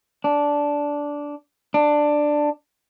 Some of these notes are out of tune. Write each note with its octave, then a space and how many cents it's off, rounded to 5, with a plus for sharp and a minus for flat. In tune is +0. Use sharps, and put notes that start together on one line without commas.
D4 -10
D4 +10